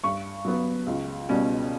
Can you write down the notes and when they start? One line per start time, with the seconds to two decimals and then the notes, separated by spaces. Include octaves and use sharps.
0.04 G2 C#6
0.45 F#3 B3
0.87 C#2
1.29 B2 G3 C#4